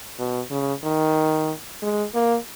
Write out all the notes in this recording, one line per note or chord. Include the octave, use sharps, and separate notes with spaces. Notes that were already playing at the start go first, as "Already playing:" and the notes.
B2
C#3
D#3
G#3
A#3